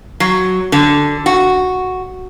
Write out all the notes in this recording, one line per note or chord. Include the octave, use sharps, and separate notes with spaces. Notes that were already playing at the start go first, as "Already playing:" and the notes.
F#3
D3
F#4